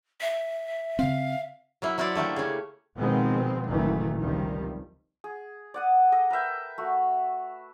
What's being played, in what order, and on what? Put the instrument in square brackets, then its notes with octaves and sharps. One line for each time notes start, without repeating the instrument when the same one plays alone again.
[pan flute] E5
[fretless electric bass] C#3 C4 [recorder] F5
[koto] F#3 A#3 E4
F#3 E4 F#4 C5 D5
D3 A3 A#3 G4
C#3 C#4
[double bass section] B2 D#3 F3 G#3 B3 C4
F#1 A#2 D#3 E3 F#3 A3
C#2 C3 D#3 F3 G3
[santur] G#4
D5 F#5 D#6
A4 D#5
A#4 B4 E5 G5
A3 F#4